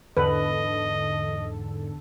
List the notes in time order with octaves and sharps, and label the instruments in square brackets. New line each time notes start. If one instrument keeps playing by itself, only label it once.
[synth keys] E2 D3 A4 [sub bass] G#2 [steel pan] B4 [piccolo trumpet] D#5